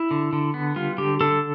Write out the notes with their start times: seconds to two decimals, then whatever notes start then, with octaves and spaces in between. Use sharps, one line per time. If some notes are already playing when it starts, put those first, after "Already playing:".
Already playing: E4
0.11 D3
0.33 D3
0.54 B3
0.76 G3 F4
0.98 D3 G4
1.21 D3 A4